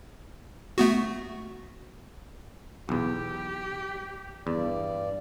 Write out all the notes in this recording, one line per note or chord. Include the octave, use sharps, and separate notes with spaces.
A3 B3 F#4
B1 E2 G4
E2 G2 D5